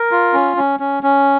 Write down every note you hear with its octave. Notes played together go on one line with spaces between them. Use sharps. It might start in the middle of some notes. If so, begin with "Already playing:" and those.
Already playing: A#4
F4
C#4
C#4
C#4
C#4